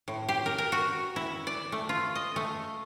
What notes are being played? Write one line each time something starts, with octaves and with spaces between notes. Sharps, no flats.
A2
G4
A#4
A#4
F#4
E4
D5
A3
F4
D#5
A3